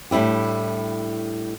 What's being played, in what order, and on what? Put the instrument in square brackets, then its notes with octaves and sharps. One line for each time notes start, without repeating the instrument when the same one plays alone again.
[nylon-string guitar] A2 G3 D4 E4 G4